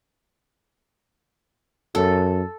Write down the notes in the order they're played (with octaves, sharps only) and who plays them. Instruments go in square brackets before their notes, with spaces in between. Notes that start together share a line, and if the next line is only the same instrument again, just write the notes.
[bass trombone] F#2 [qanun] A4